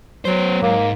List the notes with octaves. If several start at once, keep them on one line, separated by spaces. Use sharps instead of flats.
F#3 B3 C5
G#2 A#3